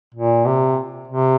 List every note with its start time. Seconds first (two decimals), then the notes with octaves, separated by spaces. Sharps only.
0.14 A#2
0.46 C3
1.08 C3